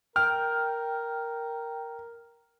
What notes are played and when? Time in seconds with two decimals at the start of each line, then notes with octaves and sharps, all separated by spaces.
0.16 A#4 G5 F6